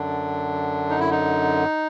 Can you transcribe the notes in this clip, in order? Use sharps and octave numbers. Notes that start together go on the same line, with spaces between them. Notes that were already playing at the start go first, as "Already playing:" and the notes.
Already playing: F#2 D3 D4
D#4
E4
D#4